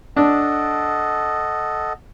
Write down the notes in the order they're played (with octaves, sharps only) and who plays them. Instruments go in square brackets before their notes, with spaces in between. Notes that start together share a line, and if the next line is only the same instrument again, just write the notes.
[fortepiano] D4 [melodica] A4 D#5 F#5